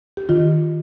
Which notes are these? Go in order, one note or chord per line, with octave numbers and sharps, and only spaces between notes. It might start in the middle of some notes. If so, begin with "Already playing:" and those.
G4
D#3 F4